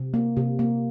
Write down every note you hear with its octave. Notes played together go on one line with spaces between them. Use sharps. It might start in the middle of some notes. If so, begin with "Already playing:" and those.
Already playing: C3
A#3
C3
A#3